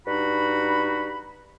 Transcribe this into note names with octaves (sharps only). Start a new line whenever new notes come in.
G2 D#4 F#4 B5